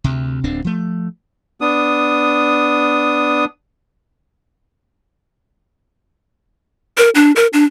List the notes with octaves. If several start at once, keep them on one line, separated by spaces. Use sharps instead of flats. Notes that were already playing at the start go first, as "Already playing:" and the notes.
D2 C3
D1 D2 C4 D4
F3 A3
B3 D4 D#6
A#4
D4
A#4
D4